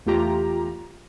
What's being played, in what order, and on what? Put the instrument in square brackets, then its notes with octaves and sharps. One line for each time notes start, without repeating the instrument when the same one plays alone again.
[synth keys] E2 A3 F4 G4 A#5